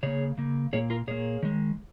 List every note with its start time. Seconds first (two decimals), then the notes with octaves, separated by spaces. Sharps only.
0.03 C#3 A#3 G#4 C#5
0.38 C#3 A#3
0.73 A#2 A#3 G#4 C#5
0.90 F4 A#4
1.07 A#2 A#3 G#4 C#5
1.43 D#3 G#3